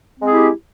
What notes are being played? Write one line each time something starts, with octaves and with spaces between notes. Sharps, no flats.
G#3 C4 E4 G4 G#4